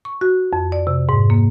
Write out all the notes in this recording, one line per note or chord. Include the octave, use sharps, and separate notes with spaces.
C#6
F#4
F2
D5
C3
G#2
A#3